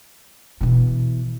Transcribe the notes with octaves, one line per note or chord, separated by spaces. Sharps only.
B2 E3